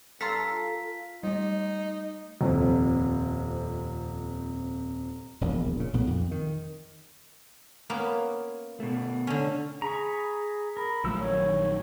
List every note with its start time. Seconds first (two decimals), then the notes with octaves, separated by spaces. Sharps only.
0.21 G2 A4 F5 A#5 C6 B6
0.52 F4
1.23 G3 A3 D#4
2.41 D#1 F2 C3
5.41 E1 A#1 D#2
5.76 A#2 C#3
5.93 B1 A#2 B3
6.07 F2
6.31 D#3
7.90 A#3 B3 C#4
8.80 B2 A3
9.27 D3 C#4
9.82 G#4 A#5 B5 C#6
10.77 A#4 B5
11.04 A#1 F3 F#3 A3 E6
11.19 D#3 C#5